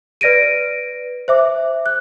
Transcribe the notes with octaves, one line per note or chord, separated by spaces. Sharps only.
B4 D5 A#6 D7 D#7
C5 E5 D6
F#6